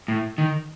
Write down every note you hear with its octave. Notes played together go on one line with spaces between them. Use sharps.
A2
D#3